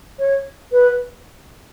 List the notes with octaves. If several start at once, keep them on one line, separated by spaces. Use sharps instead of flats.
C#5
B4